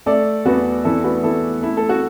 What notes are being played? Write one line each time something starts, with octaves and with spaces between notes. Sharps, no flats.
A3 A4 D5
E2 F#4 B4
E3 E4 A4
F#4 B4
E2 E4 A4
A3 E4
A4
F#4